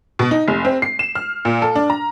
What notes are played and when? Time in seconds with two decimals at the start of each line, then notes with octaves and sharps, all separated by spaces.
0.19 B2
0.31 D#4
0.48 F1
0.65 C4
0.82 C7
0.99 E7
1.15 F6
1.45 A#2
1.62 A4
1.75 D4
1.90 A#5